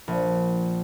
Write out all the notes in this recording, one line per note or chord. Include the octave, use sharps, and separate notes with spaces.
A#1